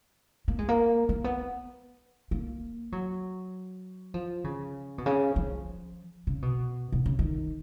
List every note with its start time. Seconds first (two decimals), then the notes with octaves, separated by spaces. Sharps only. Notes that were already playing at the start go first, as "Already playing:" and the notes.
0.48 A#3
0.59 G#3
0.68 A#3
1.09 A#3
1.24 B3
2.31 A#3
2.92 F#3
4.14 F3
4.44 C#3
4.98 B2
5.06 C#3
5.36 F3
6.27 C#3
6.42 B2
6.92 B2
7.06 C#3
7.19 D#3